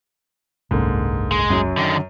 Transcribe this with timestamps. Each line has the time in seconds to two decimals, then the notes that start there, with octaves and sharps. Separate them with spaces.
0.71 F#1 C2 G#2 D3 A#3 C#4
1.32 G#3
1.50 F#2 F#3
1.77 D3 D#3